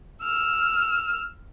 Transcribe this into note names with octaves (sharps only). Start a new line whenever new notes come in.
E6 F6